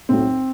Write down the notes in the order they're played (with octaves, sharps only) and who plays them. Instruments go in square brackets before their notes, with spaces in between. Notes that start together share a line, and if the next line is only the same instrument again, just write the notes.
[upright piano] B1 A2 F#3 C4